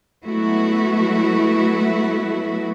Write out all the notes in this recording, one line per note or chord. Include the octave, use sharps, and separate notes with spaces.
F#3 G#3 A3 B3 E4 F#4